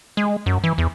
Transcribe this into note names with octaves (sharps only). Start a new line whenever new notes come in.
G#3
F#2
E3
E2